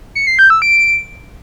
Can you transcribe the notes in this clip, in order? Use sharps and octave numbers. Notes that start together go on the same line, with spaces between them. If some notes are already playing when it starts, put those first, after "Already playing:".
C#7
C7
G6
E6
D7